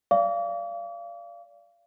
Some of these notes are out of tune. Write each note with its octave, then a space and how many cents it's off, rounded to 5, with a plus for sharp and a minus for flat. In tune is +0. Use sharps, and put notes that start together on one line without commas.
D5 -20 F5 -25 D6 -45